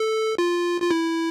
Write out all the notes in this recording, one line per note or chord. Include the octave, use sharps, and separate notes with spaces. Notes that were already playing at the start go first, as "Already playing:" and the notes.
Already playing: A4
F4
F4
E4